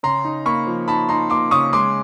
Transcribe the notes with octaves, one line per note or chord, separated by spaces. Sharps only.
C#3 A#5 C6
D#4
A#3 B5 C#6
F3
D#4 A5 B5
D#4 A#5 C6
A#3 C6 D6
C#3 C#6 D#6
G#3 C6 D6